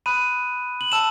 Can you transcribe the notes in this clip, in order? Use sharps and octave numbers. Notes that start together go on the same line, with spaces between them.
B5 D#6 F#6 D#7
F#7
A5 E6 E7